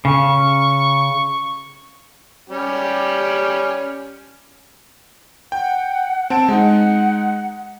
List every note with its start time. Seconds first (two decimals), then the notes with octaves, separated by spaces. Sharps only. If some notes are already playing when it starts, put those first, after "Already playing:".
0.05 C#3 C#6
2.50 G3 C#4 G4
5.52 F#5 G5
6.30 C4 A5 D7
6.49 G#3 D#4 F#5